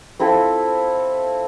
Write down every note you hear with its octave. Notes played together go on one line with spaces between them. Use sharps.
C4 E4 F4 A4